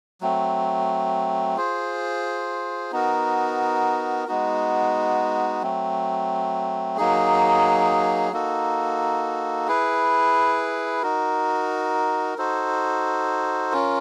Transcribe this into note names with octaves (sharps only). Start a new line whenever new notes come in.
F#3 A3 C4
F4 G#4 C5
B3 D#4 F#4 A#4
G#3 B3 D#4 F#4
F#3 A3 C4
F#3 A#3 D#4 G#4
A#3 D#4 F#4 A4
E4 G#4 B4
D#4 F#4 A#4
D#4 F#4 A4 C5
C#4 F4 A#4